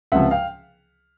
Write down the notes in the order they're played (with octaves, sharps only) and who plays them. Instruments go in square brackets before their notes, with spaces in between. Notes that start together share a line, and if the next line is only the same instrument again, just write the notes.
[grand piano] C#2 C3 F3 E5 F#5
F5 G5